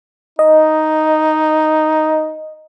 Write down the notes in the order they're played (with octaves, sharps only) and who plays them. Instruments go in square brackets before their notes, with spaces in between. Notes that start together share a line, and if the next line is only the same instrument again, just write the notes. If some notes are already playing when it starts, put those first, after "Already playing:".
[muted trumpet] D#4 [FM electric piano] D#5